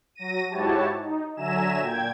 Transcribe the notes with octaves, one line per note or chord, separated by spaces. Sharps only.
F#3 A#6 D#7
G#2 E4 F#4 G4 C#5 A5
D#4
D3 F#3 E5 G#5 A#5 E7
A#2 G5 G#6